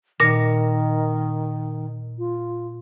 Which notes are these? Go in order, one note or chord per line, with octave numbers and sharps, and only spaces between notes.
A#2 D#3 A#6
F4